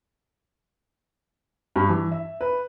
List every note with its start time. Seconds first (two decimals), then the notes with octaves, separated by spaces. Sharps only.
1.76 G2
1.89 E3
2.12 E5
2.41 B4